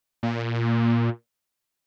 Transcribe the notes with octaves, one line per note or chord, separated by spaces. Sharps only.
A#2